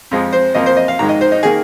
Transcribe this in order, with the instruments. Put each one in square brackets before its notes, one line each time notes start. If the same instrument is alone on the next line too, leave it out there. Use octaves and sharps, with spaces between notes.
[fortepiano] F2 F3 G#3
C5
F2 F3 A#3 D#5
C5
D#5
F5
G#2 D#3 G#3 A#5
D#5
C5
D#4
D#3 A#3 G#4